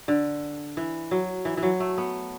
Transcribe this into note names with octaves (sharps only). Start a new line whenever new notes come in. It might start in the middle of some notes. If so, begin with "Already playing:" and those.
D3
E3
F#3
E3
E3
F#3
A3
B3